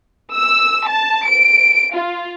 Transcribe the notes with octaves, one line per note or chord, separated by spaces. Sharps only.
E6
A5
D7
F4